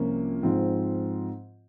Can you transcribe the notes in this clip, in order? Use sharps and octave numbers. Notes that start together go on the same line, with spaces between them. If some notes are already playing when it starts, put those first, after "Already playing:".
Already playing: C2 C3 F3 A#3 C#4
G#2 F3 C4 F4